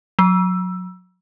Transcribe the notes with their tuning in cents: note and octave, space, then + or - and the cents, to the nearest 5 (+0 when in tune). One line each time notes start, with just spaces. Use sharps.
F#3 -20